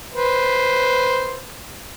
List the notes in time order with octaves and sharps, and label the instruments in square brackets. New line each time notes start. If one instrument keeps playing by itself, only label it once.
[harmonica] B4 C5